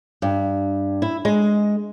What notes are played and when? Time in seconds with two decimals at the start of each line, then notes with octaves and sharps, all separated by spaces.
0.22 G2
1.02 E4
1.25 G#3